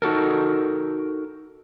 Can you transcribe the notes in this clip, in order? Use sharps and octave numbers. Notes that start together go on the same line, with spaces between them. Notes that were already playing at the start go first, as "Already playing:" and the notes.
D#4 F#4 A4 A#4